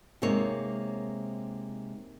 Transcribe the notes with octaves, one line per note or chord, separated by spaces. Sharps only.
C3 G#3 A#3 D#4 C#5